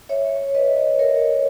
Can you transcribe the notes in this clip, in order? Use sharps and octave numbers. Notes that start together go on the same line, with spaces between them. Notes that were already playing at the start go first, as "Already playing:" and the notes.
C#5 E5
B4 D#5
A#4 C#5